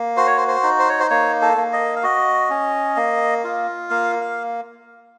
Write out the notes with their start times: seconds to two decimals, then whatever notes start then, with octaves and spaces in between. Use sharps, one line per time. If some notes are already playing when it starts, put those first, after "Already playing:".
Already playing: A#3
0.17 F#4 C5
0.27 C#5
0.37 C5
0.48 C5
0.63 D#4
0.79 C5
0.89 C#5
1.00 C5
1.10 A#3 C#5
1.42 A4
1.57 A#3
1.73 D#5
1.96 F5
2.03 F#4 D#5
2.50 C#4
2.97 A#3
3.44 F4
3.90 A#3 F5
4.21 F5